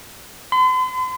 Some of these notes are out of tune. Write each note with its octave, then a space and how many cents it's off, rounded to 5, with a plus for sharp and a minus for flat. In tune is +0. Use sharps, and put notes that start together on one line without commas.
C6 -45